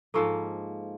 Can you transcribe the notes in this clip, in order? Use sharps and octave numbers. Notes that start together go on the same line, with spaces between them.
G#2 F3 A#3 A4 C#6 E6